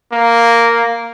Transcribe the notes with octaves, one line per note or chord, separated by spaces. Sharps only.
A#3